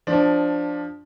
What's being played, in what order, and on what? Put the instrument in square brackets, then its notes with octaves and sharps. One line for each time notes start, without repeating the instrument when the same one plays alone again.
[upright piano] F3 D4